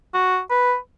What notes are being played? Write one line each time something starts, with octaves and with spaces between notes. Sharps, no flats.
F#4
B4